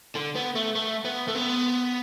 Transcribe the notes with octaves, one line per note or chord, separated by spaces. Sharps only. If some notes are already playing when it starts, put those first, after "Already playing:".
D3
B3
A3
A3
B3
A3
B3